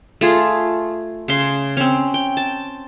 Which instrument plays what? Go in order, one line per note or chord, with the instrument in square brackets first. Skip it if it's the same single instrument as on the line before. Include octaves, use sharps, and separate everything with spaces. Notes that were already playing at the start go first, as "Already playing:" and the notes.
[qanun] A3 F4 G#4
C#3 C6
C4 C#4
G5
A5